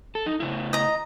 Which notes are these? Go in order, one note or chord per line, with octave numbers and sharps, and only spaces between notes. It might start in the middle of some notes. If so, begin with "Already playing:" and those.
A4
D#4
A2 C#3 E4
D#5 A#5